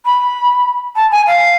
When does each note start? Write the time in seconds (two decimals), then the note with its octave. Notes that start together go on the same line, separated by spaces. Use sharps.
0.05 B5
0.96 A5
1.11 G#5
1.27 F5